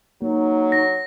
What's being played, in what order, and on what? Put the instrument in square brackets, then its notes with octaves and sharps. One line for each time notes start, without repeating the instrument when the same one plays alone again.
[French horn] F#3 [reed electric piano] A#3 [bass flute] D#4
[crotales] A#6